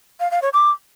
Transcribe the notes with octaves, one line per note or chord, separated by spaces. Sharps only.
F5
F5
C#5
D6